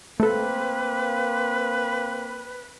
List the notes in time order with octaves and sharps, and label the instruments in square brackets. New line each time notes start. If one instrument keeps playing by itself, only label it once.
[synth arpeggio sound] A3 A4 [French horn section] A#3 C4 [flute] B4